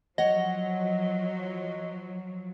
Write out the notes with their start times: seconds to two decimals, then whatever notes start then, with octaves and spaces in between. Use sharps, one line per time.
0.18 F3 F#3 C#5 D#5 F#5